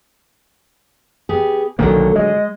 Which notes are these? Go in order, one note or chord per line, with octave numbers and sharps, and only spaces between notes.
B3 G4 G#4
B1 A#2 D3 D#3 F#3 A#3 A4
G#3 D#5